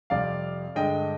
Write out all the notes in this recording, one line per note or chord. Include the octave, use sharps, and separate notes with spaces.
F2 C3 G3 D5 F5
G2 D3 G#3 D#5 G5